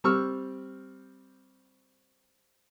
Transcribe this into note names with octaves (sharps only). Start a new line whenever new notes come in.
G3 C4 C#6 E6 F6